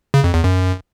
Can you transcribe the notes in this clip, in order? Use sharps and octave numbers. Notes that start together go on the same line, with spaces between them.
C#3
F2
E2
F#2